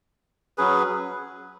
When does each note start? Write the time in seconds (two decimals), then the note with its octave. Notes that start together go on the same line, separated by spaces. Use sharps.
0.58 F#3 C#4 G#4 B4